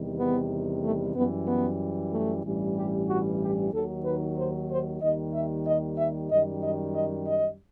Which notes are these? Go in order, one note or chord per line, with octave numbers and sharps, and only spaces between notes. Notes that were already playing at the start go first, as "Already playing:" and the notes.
Already playing: E2 C3 D#3 G3
B3
A3
F#2 E3 G3 B3
B3
A3
A1 G2 E3 G3
G4
F#4
G4
D#2 D#3 F#3 A4
B4
C5
C5
D#2 D#3 G3 D#5
E5
D#5
E5
F#2 D#3 G3 D#5
D#5
D#5
D#5